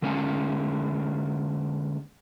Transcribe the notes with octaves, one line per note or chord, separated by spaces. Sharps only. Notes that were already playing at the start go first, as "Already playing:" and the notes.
D3 G#3 A#3 C#4